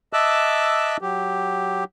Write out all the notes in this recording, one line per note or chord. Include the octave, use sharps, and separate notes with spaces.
D#5 E5 A5 D6 E6 F#6
F#3 G4